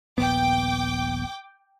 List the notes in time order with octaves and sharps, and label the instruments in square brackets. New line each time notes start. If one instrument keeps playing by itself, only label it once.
[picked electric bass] D#1 A#1 B3 [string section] G5 D6